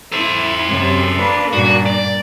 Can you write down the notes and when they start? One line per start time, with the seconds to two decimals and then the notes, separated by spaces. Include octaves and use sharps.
0.12 E4 A4 C5
0.67 F#2 C3
1.17 A#3 D4 B4
1.53 G2 A#2 F#4
1.86 D5